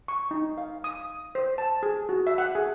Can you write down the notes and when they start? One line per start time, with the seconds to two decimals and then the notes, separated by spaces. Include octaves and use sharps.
0.08 C#6
0.31 D#4
0.58 F5
0.84 D#6
1.35 C5
1.58 A5
1.83 G#4
2.09 F#4
2.27 E5
2.38 F#5
2.55 G#4